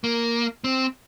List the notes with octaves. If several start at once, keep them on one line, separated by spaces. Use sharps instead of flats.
A#3
C4